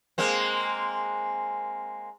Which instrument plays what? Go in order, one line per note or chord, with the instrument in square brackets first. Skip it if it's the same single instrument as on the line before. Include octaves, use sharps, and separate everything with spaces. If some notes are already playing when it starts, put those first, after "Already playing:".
[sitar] G#3 A#3 C4